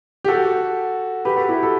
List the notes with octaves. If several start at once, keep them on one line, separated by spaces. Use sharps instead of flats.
G4
F#4 A4
G4 B4
F#4 A4
E4 G4
A4